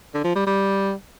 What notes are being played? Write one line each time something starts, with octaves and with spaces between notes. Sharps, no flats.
D3
F3
G3
G3